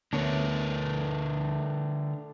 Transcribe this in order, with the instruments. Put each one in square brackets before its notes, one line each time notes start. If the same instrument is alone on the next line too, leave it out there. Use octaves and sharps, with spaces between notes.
[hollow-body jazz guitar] D2 B3 C#5 [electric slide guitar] D3 A#4 B4 [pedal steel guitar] A3 D4